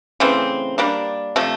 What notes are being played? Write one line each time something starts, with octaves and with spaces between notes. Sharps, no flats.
C#3 E3 A3 C4
G3 A#3 D4
C3 F3 A3